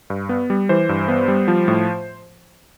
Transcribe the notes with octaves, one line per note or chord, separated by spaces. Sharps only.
G2
B3
G3
E3 C5
G2
B3
G3
F3
A2